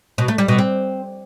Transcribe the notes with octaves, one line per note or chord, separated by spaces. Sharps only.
B2
A3
G3
B2
C4